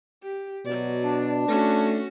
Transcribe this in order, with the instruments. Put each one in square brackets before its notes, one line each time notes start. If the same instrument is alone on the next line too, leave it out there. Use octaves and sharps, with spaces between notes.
[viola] G4
[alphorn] B2 [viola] F#3 D5
[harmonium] D4
[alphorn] A3 [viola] C#4 F#4